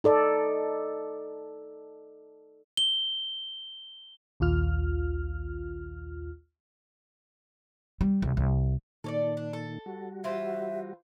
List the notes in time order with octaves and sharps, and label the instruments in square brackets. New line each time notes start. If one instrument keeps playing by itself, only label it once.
[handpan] D#4 A4 D5 D#5
[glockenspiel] G7
[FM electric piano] A#1 D#2 F4 F6
[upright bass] G3
C2
C2
[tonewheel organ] A#2 D#3 [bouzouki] A4 C#5 D5
[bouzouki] D4
A4
[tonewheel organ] G3 F#4
[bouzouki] E3 F4 C5 [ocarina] E5